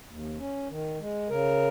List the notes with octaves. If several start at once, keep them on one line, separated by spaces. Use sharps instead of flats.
D#2
C#4
D#3
G#3
C#3 A#4